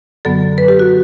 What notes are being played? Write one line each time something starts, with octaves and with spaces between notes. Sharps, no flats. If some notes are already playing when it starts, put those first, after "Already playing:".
F#2 D3 F#3 B3 A4
B4
G4
F#4